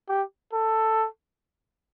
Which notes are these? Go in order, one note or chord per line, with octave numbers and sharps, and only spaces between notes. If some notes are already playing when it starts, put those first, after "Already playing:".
G4
A4